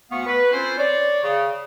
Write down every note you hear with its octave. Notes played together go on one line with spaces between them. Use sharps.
D2 B3 F5 C#6
B4
C4 C#4 E4 F4 A4 C5
C#5 D5
C#3